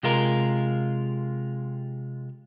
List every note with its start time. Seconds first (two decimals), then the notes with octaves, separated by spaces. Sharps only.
0.03 C3 G#3 F4 A#4